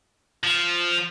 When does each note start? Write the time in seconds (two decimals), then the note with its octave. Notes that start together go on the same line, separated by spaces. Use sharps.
0.44 F3